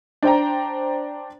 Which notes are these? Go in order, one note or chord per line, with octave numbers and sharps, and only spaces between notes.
D4 C5 G5 A#5